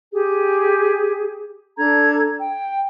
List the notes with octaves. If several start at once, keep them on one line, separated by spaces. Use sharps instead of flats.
G4 G#4
D4 A4 A#5 G#6
G5